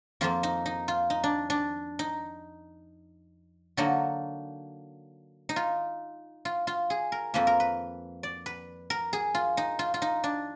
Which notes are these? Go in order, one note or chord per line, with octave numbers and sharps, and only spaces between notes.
F2 F3 A#3 F4
D#4
D#4
F4
D#4
D4
D4
D#4
D3 F#3 A#3 D#4
D#4
F4
F4
F4
G#4
A#4
F2 F3 A#3 B4
A#4
B4
D5
B4
A#4
G#4
F4
D#4
F4
F4
D#4
D4